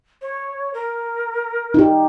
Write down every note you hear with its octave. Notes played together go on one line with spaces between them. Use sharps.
C#5
A#4
D#4 G4